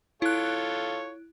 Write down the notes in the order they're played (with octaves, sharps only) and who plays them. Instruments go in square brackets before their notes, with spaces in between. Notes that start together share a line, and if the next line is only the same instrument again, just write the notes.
[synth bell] E4 F#6 [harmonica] F4 A4 C#5